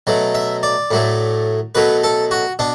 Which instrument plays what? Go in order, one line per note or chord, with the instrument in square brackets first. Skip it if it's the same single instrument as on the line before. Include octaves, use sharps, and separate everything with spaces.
[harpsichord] B2 F#3 A3
E5
D5
A2 F#3 A3
B2 F#3 A3 B4
A4
F#4
B2 D4